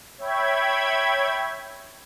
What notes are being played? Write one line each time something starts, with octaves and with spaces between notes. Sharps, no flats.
C#5 E5 G5 B5 G#6